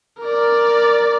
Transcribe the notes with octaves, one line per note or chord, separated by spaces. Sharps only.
A#4 D5